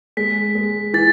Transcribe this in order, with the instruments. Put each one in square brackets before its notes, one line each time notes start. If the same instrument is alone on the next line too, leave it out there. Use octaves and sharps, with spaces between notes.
[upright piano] G#3 [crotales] B6
[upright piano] G#3
[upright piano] E3 [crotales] A6